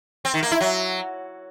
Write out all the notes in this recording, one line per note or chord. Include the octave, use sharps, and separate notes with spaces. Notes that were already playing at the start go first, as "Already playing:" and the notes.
C4
D#3
A#3
E4
F#3